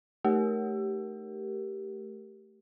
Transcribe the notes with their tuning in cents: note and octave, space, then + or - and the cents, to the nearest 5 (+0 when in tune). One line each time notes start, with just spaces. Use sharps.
A3 +0 G4 -5 A#4 +0